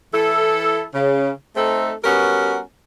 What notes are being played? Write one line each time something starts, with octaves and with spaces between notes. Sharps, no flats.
E3 E4 A4
C#3
A3 C4 D#4 A4
G3 B3 C#4 F#4 A#4